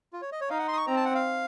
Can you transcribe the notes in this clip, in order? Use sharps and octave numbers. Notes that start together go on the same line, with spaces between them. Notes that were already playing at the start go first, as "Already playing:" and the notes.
F4
C#5
D#5
C#5
D#4 F5
F#5
C6
D#6
C#6
C4 A#5
A5
F#5
F5